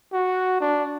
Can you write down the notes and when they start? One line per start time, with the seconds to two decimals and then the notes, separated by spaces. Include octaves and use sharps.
0.13 F#4
0.60 D4